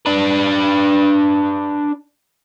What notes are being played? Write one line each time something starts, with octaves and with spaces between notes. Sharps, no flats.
D4 B4